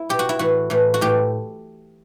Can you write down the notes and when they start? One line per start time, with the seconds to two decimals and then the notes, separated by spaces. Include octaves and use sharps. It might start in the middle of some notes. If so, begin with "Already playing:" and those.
Already playing: E4
0.09 B2 G4
0.19 F#4
0.29 E4
0.39 A2 E3 F#4
0.70 A2 E3
0.94 F#4
1.01 A2 E3 G4